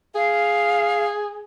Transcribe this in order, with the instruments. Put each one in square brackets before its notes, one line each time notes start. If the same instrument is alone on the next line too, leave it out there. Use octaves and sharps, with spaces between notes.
[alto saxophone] G#4 [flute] F5